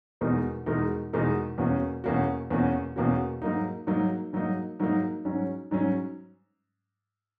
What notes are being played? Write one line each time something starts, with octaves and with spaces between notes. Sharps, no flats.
E2 B2 G#3 D#4 A#4
E2 B2 G#3 D#4 A#4
E2 B2 G#3 D#4 A#4
E2 B2 A#3 C#4 F#4
E2 B2 A#3 C#4 F#4
E2 B2 A#3 C#4 F#4
E2 B2 A#3 C#4 F#4
G#2 F#3 A#3 D#4
G#2 F#3 A#3 D#4
G#2 F#3 A#3 D#4
G#2 F#3 A#3 D#4
G#2 F#3 C#4
G#2 F#3 C#4